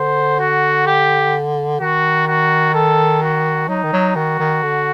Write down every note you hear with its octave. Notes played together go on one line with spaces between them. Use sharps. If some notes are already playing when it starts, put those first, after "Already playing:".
Already playing: D3 C5
F#4
G4
D#3 F#4
F#4
A4
F#4
F#3 D#4
D#3
F#3
D#3 F#4
D#3
D3